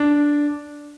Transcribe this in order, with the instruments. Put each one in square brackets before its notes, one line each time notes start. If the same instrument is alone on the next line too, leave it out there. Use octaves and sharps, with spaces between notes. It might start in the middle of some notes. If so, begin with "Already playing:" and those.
Already playing: [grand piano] D4